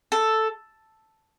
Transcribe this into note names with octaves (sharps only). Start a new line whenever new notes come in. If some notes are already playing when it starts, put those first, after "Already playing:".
A4